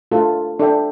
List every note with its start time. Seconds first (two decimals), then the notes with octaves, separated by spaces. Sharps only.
0.11 A3 D4 F4 A4
0.59 D4 A4 E5 G5